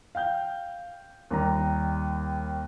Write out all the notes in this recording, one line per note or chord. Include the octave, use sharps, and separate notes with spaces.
F5 G5 G6
D#2 G3 A#5